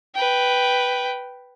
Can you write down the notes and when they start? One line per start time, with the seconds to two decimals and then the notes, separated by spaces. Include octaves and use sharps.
0.15 B4 G5